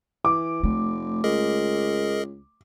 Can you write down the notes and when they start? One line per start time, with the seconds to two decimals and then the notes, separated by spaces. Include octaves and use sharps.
0.25 E3 D6
0.63 F1 A3
1.24 C#2 G#4 A#4 D#5